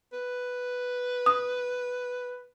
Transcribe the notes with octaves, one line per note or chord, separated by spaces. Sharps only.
B4
D#6